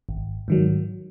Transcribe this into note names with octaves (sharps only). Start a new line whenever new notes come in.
G#1
G#2 D#3 F#3